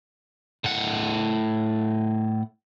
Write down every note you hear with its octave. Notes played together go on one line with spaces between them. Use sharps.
A2 F#5